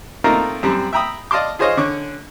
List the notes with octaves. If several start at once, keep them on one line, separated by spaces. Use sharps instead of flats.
A3 A#3 C4 D#4 F4 A#4
F#2 G3 C4
E5 G5 A#5 B5 D#6
D5 D#5 F5 A5 C6 D6
F4 G#4 C5 C#5 D#5 F5
D3 C#4 C#6 D6